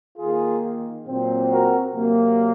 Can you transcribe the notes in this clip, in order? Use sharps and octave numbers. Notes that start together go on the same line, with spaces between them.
D#3 A#3 F4 G#4
A#2 F#3 C4
F#4 A#4
C3 F#3 A#3